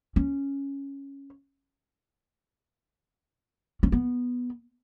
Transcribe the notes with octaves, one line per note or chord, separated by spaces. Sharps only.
C#4
C#4
B3